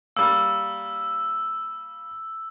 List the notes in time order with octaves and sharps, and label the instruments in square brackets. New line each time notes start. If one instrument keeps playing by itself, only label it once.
[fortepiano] G3 A#3 [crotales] E6